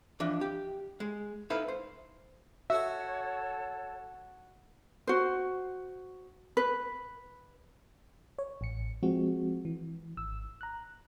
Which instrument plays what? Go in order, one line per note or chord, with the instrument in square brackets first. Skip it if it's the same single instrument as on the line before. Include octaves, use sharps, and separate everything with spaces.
[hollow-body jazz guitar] E3 F3 D4
G4
G#3
D#4 E4 A4 B4 F5
C5
[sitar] F#4 [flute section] A4 C#5 [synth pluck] E5
[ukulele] F#4 C5
B4
[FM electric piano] C#5
A1 C#7
F3 G#3 C4 F#4
E3
G#1 E6
A#5 F#6